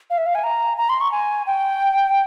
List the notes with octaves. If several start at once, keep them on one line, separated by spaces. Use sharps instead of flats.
F5
E5
F5
G#5
A#5
A#5
C6
C#6
G#5
G5